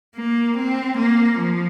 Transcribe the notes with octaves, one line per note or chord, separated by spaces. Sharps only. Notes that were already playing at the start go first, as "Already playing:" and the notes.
A#3
C4
A#3
F3